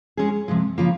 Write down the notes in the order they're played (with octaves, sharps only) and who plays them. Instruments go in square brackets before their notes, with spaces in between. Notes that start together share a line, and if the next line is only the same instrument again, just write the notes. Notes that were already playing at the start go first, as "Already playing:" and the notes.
[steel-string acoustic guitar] G#3 C#4 G#4
C3 F3 G#3
C#3 F3 A#3 F4